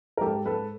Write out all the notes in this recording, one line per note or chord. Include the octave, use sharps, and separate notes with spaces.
A#4
G#2 G4 A4
G#2 A4 B4